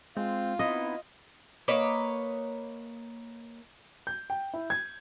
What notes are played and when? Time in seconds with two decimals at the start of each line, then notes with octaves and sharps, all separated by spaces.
0.17 G#3 C4 F4
0.59 B3 C4 D#4 E4 D#5 B5
1.68 A#3 B4 C#5 D#5
4.07 G6
4.30 G5
4.53 E4
4.70 G#6